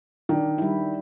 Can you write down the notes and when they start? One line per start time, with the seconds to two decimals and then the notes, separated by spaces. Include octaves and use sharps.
0.29 D#3 D4
0.58 G3 E4